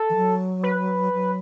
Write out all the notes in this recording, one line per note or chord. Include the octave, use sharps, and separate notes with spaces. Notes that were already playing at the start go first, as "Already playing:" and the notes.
Already playing: A4
E3
F#3
B4
F#3